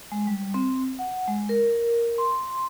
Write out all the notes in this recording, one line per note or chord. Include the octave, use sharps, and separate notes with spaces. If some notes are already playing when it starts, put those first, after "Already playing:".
G#3
G3
C4
F#5
G#3
A#4
C6